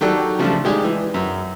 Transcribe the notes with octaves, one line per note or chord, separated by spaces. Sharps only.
D#3 F#3 G4 A4 D5 F#6
C#3 F3 G3 A3 D4
D#3 G#3 G4 G#4 D5
E3
F#2